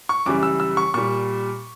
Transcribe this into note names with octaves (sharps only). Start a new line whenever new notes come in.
C#6
F#2 C#3 E3 G3 D6
E6
E6
C#6
A#2 G3 C#6